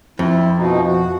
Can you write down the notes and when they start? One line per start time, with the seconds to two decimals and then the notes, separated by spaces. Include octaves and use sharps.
0.19 F2 E4
0.57 B2 F3 D#4
0.86 F#4